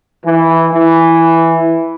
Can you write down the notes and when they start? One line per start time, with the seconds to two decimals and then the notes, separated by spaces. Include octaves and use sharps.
0.25 E3
0.72 E3